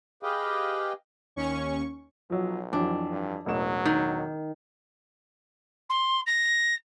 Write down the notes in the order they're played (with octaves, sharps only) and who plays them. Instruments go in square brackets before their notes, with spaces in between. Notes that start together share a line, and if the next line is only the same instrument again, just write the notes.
[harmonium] G4 G#4 B4 D#5 F5 G5
[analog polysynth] D#2 C#4 C#6
[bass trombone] B1 [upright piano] F3 F#3
[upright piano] F2 E3 F#3 [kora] D4
[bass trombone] G2
[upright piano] E1 A1 E7 [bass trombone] F#3
[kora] D#3
[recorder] C6
A#6